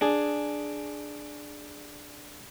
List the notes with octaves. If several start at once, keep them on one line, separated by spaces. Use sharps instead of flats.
D4 G#4